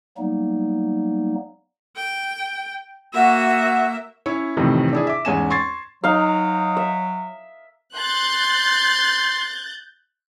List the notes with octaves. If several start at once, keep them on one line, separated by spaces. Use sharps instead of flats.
F#3 G3 A#3 B3 D#4
G5
A#3 F#4 E5
C#4 E4 C#5
F2 A2 C3 D#3 E3
D4 E4 G#4
E5 D6
E2 G#2 C#4 G#5 E7
C6 C#6 G#6 A6 C7
F#3 D#4 F5
E5
C6 F#6 G6 A6